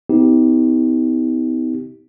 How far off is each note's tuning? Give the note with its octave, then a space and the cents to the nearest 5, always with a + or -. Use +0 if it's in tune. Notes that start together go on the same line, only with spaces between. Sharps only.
B3 +45 D#4 +40 G4 +0